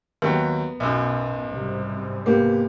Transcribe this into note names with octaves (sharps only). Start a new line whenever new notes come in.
D#2 F#3 B3 G5
B1 F#2 B2
G#2 C3 G3
A#3 B3 G4